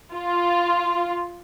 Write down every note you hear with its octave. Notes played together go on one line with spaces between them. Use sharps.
F4